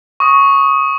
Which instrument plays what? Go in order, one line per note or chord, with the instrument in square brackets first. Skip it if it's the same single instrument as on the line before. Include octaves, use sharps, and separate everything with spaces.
[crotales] C#6 D#6